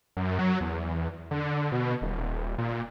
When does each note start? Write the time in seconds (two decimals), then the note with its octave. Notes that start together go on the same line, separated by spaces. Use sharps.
0.17 F#2
0.39 F#3
0.61 E2
1.31 D3
1.72 B2
2.02 D#1
2.58 A#2